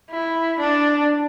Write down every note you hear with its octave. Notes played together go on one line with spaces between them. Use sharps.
E4
D4